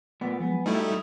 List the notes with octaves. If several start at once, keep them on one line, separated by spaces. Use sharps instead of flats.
A#2 A3 B3 D5
F3 F#3 G#3 B3 G#5
G3 A3 D#4 E4 F#4 A4